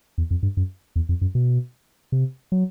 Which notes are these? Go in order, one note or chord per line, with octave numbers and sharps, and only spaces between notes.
E2
F2
G2
F#2
E2
F2
F#2
B2
C3
F#3